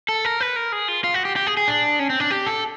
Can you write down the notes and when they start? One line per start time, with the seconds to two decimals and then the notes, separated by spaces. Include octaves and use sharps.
0.09 A4
0.25 A#4
0.41 B4
0.56 A#4
0.72 G#4
0.88 F4
1.04 F4
1.14 F#4
1.25 G4
1.36 G4
1.47 G#4
1.57 G#4
1.68 D4
1.99 C#4
2.10 C4
2.20 D4
2.31 G4
2.46 A4